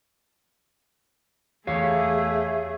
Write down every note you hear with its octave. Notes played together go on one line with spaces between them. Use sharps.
E2 A3 G4 G#4 C#5 E5 F5